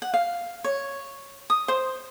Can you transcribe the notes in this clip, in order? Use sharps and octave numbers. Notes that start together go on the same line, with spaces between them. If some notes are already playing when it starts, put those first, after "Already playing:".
F#5
F5
C#5
D#6
C5